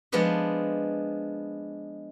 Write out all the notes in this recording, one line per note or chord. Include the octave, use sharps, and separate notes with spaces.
F3 G#3 B3 D4 B4 D#5